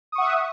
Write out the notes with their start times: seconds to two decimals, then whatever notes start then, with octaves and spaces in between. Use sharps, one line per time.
0.12 D#6
0.15 C#6
0.18 F#5
0.21 E5